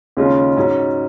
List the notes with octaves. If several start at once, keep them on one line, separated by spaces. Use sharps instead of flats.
D#2 C#3 G#3 C#4 F4
G#2 F#3 C#4